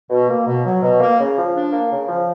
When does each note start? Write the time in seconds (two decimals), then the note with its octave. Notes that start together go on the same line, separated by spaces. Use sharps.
0.10 B2
0.29 A#3
0.46 B2
0.64 F#3
0.82 B2
1.00 A#3
1.19 C#3
1.37 F3
1.55 D4
1.72 A#3
1.91 C#3
2.09 F3